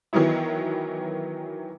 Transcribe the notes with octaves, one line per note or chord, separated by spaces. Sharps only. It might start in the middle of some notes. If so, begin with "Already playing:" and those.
D#3 E3 F#3 B3 E4